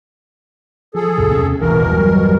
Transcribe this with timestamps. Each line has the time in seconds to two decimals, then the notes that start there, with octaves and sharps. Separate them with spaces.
0.95 F3 G#4 A4
1.18 C#2 F#2 B2
1.31 E2 C3 C#4
1.61 D#1 A1 B2 E3 A#4
1.79 G1 E2
1.92 F#3 G3